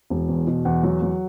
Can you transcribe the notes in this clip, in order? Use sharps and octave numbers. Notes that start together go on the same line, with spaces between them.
E1
E2
B2
E2 F#5
F#3
F#3